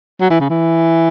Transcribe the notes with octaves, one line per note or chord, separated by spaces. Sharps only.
F#3
E3
C#3
E3